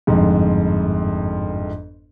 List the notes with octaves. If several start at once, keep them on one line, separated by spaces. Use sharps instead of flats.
G1 F2 G#2